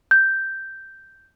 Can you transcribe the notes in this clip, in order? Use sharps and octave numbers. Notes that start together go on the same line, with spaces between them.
G6